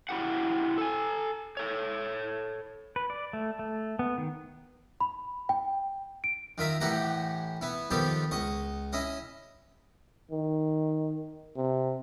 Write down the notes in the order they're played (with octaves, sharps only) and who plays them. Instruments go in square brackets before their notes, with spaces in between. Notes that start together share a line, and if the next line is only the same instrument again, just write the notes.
[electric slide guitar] E4 F#4 G4 F#5
A4 G#5
A4 C#5
[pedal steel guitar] B4
D5
A3
A3
B3
D#3
[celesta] B5
G5
D7
[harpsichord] D#3 F4 E5 A#5
A2 E3 E4 G4 F#5 A#5
B3 E4
D#3 F3 B3 G4 A4
C#2 D#5 C#6
C#4 E4 D#5
[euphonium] D#3
C3